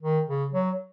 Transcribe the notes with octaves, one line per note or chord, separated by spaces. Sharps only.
D#3
C#3
F#3